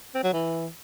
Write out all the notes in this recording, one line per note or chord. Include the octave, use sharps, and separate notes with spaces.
C4
F#3
E3